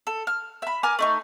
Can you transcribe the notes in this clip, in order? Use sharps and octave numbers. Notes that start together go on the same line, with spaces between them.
A4
F6
E5 B5
A#4 G#5 D6
A3 D#4 C#6